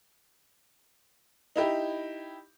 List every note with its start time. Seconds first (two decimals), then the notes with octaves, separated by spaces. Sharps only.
1.56 D#4 E4 G4